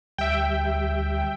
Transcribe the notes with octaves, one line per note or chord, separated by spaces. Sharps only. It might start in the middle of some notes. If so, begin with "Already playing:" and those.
D2 G3 E5 G5